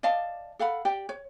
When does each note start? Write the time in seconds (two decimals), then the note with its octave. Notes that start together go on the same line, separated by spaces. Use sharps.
0.03 D5 D#5 F5 A5
0.59 A4 F5 F#5 B5
0.85 G4 D5 G5
1.09 C#5